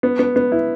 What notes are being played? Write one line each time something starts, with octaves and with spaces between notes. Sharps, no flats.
B3
B3
B3
E4